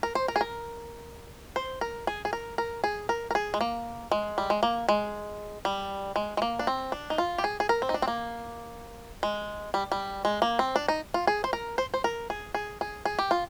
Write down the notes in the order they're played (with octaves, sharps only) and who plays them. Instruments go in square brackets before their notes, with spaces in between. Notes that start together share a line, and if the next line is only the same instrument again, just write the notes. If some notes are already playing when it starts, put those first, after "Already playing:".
[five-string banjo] A#4
C5
A#4
G#4
A#4
C5
A#4
G#4
G#4
A#4
A#4
G#4
A#4
A#4
G#4
G#3
A#3
G#3
G3
G#3
A#3
G#3
G3
G#3
G#3
A#3
D4
C4
D4
D#4
F4
G4
G#4
G#4
A#4
C4
D#4
D4
C4
A#3
G#3
G3
G3
G#3
A#3
C4
D4
D#4
F4
G#4
C5
A#4
C5
C5
A#4
G#4
G#4
G#4
G#4
G4
F4